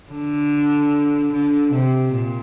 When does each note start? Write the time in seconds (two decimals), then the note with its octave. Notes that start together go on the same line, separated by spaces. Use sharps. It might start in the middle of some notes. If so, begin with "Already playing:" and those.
0.11 D3
1.32 D3
1.73 C3
2.13 A#2